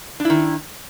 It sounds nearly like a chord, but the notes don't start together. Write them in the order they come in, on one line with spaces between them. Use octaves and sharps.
D4 E4 D#3